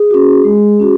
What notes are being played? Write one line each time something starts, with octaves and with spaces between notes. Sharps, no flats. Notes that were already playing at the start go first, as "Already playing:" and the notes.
Already playing: G#4
C#4 F#4
G#3
C#4 F#4